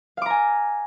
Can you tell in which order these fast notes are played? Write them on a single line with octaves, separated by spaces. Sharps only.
F5 D6 A#5 G#5